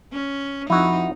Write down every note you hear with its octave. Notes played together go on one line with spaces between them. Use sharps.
C#4
F2 F3 D#4 E4 F#4